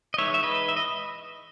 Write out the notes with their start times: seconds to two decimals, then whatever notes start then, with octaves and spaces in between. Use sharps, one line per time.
0.14 D#5
0.18 E3 G#3 D#4 C#5 E5
0.34 E5
0.43 B4 D#5
0.68 E5
0.77 D#5